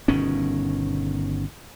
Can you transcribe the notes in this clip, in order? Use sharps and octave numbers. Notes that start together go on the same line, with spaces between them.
G1 B2 D#3 C#4